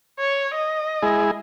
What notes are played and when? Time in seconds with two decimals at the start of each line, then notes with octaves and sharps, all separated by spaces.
0.20 C#5
0.55 D#5
1.03 G#3 E4 G#4